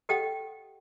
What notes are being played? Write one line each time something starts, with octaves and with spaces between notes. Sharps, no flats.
G4 A4 D#5 F#5 G5